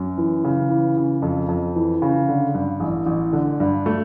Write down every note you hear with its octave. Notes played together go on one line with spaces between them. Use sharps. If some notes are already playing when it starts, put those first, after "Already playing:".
Already playing: F#2
E3
C#3
E3
C#3
F2
F2
E3
C#3
D3
G2
A1
A1
D3
G2
A3